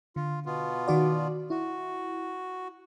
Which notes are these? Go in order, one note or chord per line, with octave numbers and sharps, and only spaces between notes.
D3 F4
B2 B3 F4
D#3 F#4 D5
E4 F#4